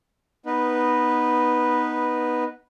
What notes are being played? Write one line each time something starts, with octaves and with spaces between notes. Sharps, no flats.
B3 D#4 B4